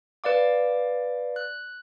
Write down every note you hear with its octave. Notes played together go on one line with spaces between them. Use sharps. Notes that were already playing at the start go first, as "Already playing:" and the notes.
B4 D5 F5 D6
F#6